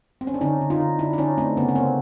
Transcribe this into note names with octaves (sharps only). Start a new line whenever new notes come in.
C4
C#4
D4
D3 C#4 D#4
D3
D#4 F4
D3
D3 D4 E4
D4
D3 C#4 D#4
A3 C4 D4
C#3 B3 C#4
C#4
C#3 A#3 C4